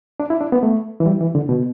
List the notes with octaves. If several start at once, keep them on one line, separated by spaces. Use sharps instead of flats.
D4
E4
D4
B3
A3
E3
G3
E3
D3
B2